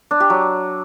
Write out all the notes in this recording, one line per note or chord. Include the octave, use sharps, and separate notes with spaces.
D4
G4
F#3